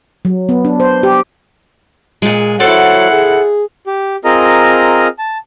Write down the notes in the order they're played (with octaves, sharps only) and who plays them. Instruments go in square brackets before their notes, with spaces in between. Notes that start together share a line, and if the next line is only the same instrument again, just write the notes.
[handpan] F#3
B3
D4
C5
G4
[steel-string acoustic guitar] A#2 G#3
[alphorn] F#3 [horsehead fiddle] E4 F#5 [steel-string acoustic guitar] A4 C5 D5
[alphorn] G#4
[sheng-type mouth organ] G4
C4 F4 G#4 A#4 D#5 A#5
A5